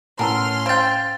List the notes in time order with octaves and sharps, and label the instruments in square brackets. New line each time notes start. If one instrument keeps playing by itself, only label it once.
[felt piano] A2 A5 E6 [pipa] B3 A#4 [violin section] C#4 C6 F6
[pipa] C5 G5 [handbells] F5 A6 [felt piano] D7